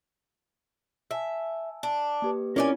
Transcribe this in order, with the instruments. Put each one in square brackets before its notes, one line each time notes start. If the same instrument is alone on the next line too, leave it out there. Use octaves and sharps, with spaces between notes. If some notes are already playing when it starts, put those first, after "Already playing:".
[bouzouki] E5 [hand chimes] G#5 A5 E6
[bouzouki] D4
[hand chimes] A#3 G4 B4
[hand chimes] C4 E4 F4 [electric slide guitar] C#4 [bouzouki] A#4 D5 G#5